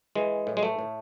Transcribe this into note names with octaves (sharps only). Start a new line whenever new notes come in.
E3 G#3
A2
G#3
A3
A2